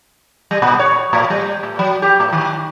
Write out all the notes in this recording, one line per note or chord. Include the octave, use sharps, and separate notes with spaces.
G3
A#2
C#5
A2
G3
A2
F#3
G4
A2
D#3